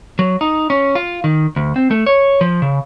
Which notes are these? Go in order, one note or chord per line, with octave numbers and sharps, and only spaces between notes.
F#3
D#4
C#4
F4
D#3
D2
C4
A3
C#5
F3
C#3